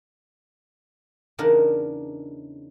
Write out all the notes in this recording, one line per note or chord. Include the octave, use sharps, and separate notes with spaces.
E2 C#3 D4 D#4 A#4